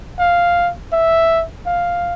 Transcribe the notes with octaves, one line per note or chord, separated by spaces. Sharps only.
F5
E5
F5